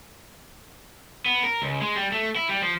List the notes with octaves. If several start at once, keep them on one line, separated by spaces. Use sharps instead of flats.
B3
A#4
C#2
G#3
G3
A3
E4
G3
F3